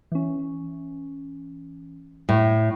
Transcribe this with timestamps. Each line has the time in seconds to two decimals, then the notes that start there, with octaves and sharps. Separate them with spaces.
0.12 E3 C#4
2.29 A2